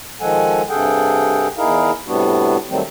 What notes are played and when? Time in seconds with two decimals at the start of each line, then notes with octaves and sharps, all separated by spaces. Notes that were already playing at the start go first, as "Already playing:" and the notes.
0.21 D#3 F3 G#3 A4 F#5 G#5
0.69 G2 C3 G#4 A4 F#5 G5
1.58 E2 D#4 E4 G#4 A#4 F5
2.07 A2 C3 G3 B3 D4 F#4
2.70 D#3 F#3 G3 A3 C4